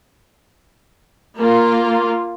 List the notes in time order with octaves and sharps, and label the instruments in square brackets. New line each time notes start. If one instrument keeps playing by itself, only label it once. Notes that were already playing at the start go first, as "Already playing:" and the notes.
[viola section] A#3 F4